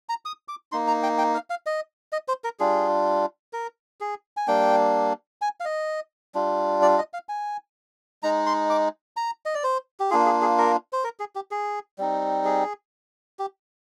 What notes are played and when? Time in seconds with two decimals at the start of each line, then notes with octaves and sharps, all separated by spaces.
0.09 A#5
0.25 D#6
0.48 D6
0.72 A#3 D#4 C6
0.87 A#5
1.03 G5
1.18 G5
1.34 F5
1.50 F5
1.66 D#5
2.12 D#5
2.28 C5
2.44 A#4
2.59 G3 D4 F4 G#4
3.53 A#4
4.00 G#4
4.37 G#5
4.47 G3 A#3 D4 G5
5.42 G#5
5.60 F5
5.65 D#5
6.35 G3 D4 F4
6.82 D5
6.98 D#5
7.13 F5
7.29 G#5
8.23 G#3 D#4 A#5
8.46 C6
8.70 D6
9.17 A#5
9.46 D#5
9.54 D5
9.64 C5
10.00 G4
10.10 A#3 D4 F4 G#4
10.26 G#4
10.42 G#4
10.58 A#4
10.93 C5
11.04 A#4
11.20 G#4
11.35 G4
11.51 G#4
11.98 G3 C4 D#4
12.45 G#4
13.39 G4